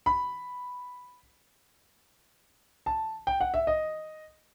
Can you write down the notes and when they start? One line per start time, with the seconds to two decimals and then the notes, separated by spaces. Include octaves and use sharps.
0.06 B5
2.86 A5
3.27 G5
3.41 F#5
3.54 E5
3.67 D#5